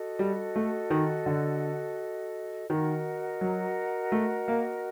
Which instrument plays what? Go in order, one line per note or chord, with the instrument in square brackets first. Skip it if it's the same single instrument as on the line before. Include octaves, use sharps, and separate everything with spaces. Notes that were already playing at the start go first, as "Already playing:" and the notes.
Already playing: [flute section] F#4 A4 D#5
[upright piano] G3
A3
D#3
D3
[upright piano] D#3 [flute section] F#4 A#4 D#5 F#5
[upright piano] F#3
A3
A#3